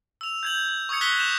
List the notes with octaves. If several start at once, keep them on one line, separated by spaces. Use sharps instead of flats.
E6 F7
G6 G#6 F#7
F#7
C#6 D#6 E6 G#6 C#7
F#6 G#6 A#6 B6 G7
D6 G6 E7 F7